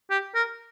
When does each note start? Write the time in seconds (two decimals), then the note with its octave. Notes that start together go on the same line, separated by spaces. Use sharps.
0.10 G4
0.35 A#4